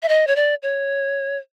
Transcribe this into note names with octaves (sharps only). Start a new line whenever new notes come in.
E5
D#5
C#5
D5
C#5